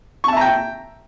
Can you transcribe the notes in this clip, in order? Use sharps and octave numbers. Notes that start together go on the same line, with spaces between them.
E5 G5 A5 A#5 C#6